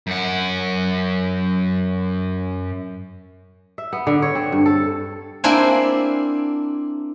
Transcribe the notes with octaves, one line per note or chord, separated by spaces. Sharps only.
F#2 F#5
E5
B3
D3
C#5
C4
G2
A4
A#3 C4 D4 E4 C5 G#5